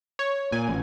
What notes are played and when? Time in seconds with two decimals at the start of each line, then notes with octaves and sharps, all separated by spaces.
0.19 C#5
0.52 A#2 G#5
0.69 A1